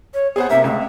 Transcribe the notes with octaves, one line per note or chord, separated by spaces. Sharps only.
C#5
B3 G#4 C5 F#5
C3 A#3 E5
C#2 A3